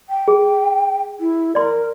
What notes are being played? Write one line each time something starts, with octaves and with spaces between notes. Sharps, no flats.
G5
G#4
E4
A#4 D5 C6